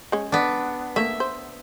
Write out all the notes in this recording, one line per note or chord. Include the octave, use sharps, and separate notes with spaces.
G#3 C#4
B3 D4
A3 A#3 E5
C5